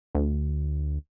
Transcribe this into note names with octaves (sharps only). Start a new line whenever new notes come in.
D2